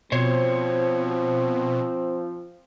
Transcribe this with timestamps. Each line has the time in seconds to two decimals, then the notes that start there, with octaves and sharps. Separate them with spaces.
0.12 B2 F3 C4 C5 C#5